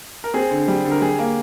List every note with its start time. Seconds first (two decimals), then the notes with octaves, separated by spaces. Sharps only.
0.24 A#4
0.34 C4 G#4
0.51 D3
0.68 G3
0.85 D3
0.91 A#4
1.01 G3 G#4
1.19 A#3